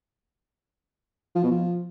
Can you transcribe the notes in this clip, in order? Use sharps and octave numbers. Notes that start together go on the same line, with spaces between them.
F3
B2
F3